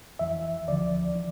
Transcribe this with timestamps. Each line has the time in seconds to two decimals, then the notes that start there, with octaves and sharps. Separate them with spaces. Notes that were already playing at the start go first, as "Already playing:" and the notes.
0.19 F2 E3 E5
0.68 D2 D3 F3 D5
1.16 E3